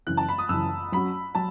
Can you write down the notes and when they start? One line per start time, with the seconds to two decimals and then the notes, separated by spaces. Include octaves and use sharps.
0.07 F#2 C#3 E3 F#6
0.17 A5
0.28 B5
0.38 D#6
0.49 F#2 C#3 E3 E6
0.92 F#3 C#4 F#4 B5
1.35 F#3 A5